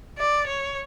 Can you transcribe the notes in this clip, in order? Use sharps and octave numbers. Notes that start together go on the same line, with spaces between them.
D5
C#5